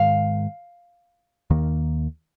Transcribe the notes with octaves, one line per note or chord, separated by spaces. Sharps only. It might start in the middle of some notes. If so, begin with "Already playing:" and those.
Already playing: G#2 D#3 G#3 F5
D#2 D#3 A#3